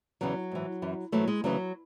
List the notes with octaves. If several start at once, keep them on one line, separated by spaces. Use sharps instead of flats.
E2 C#3 E3 F#3
G#2 E3
F#2 E3
G#2 E3 F#3 A3
G#3
D2 C#3 E3 F#3